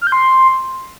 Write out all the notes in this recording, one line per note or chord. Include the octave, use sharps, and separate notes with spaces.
F6
G6
C6